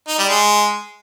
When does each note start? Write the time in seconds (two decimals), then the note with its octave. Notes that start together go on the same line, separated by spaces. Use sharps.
0.08 D#4
0.18 G3
0.28 G#3